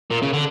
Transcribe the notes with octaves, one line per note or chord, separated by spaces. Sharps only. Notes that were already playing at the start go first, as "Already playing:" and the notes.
A#2
C#3
D3